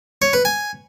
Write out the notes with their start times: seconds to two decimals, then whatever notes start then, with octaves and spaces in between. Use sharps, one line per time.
0.22 C#5
0.33 B4
0.45 G#5